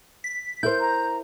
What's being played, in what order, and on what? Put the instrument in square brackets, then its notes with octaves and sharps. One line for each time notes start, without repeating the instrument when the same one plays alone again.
[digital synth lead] B6
[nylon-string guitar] E4 A#4 C5 [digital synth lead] G6
[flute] A#5